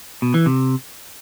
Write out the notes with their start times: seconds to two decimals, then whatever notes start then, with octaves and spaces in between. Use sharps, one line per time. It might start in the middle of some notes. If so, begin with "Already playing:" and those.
0.22 B2
0.34 E3
0.46 C3